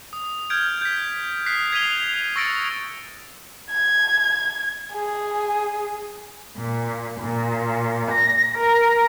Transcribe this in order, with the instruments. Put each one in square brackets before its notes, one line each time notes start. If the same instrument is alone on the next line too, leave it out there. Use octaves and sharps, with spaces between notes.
[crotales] D#6
F6 G6 G#6 D7
G6 B6
D#6 F#6 B6 C7
G#6 B6 C7 D#7 F7 G7
C#6 E6 A6 A#6 C#7 D7
[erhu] G#6
G#4
[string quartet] A#2
A#2
A#6
A#4